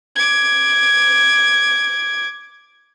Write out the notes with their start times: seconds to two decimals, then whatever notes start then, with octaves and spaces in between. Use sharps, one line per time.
0.16 D6 G#6